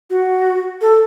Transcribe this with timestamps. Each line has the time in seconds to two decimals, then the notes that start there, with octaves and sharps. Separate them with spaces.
0.10 F#4
0.81 A4